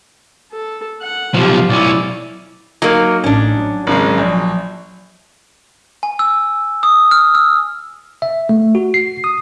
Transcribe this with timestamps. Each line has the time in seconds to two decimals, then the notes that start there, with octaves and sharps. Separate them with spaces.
0.52 A4
1.02 F#5
1.34 B1 F3 F4 G4
1.69 B1 C#4 E4 D5
2.82 F#3 A#3 D#4
3.24 A1 C#4 D4
3.57 F#3
3.87 G#1 C#3 G#3
4.18 A#1
6.03 G#5
6.19 E6
6.83 D#6
7.11 F6
7.35 E6
8.22 E5
8.49 A3
8.75 F#4
8.94 C7
9.24 D#6